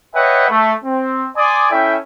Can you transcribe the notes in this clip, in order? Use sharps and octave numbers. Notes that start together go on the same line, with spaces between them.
B4 C#5 D#5 E5 F#5 G5
A3
C4
D5 G#5 C6 D6 D#6
C#4 E4 A4 E5 G5